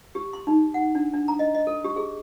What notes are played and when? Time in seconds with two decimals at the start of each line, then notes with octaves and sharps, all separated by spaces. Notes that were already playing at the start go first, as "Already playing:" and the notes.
0.15 G4
0.33 C6
0.47 D#4
0.74 F#5
0.95 D4
1.13 D4
1.28 A#5
1.39 D#5
1.55 D#5
1.67 A4
1.84 G4
1.96 G#4